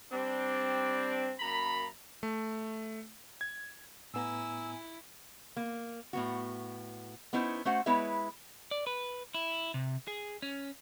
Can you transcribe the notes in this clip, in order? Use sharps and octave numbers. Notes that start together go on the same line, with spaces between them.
G3 C4 D4
F#2 A#3 A#5 B5
A3
G#6
A2 B3 E4 G#5 A#5 E6
A#3
A2 B3 F#4
B3 C#4 D#4 E4 C5
A3 C#4 F#4 C5 F#5
G#3 B3 E4 B4 C#5 E5
D5
B4
E4
C3
G#4
C#4